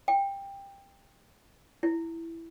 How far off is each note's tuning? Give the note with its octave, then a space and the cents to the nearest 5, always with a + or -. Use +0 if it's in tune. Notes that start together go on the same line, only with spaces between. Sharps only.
G5 +15
E4 +5